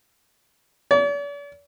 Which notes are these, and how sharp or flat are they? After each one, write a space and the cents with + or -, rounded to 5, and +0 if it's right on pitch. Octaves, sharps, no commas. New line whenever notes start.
D5 -45